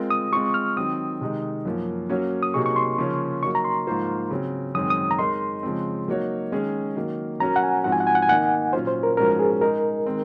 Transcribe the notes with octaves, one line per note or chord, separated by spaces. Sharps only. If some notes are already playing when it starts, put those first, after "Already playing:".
Already playing: G#3 C4 F4 A#4
D#6
G#3 C4 F4 C#6
F6
D#3 F#3 C4 D#6
C3 D#3 G#3 D#4
F#2 F3 A#3
F#3 A#3 C#4 F#4 C#5
D#6
C3 F#3 A#3 D#4 G#4 C#6
C#6
C6
C#3 F3 A#3 C#4
F#3 A#3 D#4 C#6
A#5
C6
G#2 F3 A#3 F4 C5
C#3 F#3 C4
F#2 D#3 G#3 C4 D#6
D#6
A#5
G#3 D#4 A#4 D#5 C6
C#3 F3 G#3 C4
F#3 A#3 D#4 F#4 C#5
D#3 G#3 C#4 G#4
D#3 F#3 A#3
F#3 C#4 F#4 A#4 A#5
F#5
G#5
G#2 F3 C4 F#4 F#5
G#5
F#5
G#5
F#5
G#5
D#3 A#3 D#4 F#5
A#2 F#3 C#4 F4 C5
C5
A#4
G#2 F3 G#3 C#4 F#4 A#4
G#4
G#3 D#4 G#4 A#4
D#3 G#3 C4